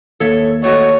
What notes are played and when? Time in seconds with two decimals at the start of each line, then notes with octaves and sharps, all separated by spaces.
0.20 D#2 A4 C#5 E5
0.64 A3 F#4 C#5 D#5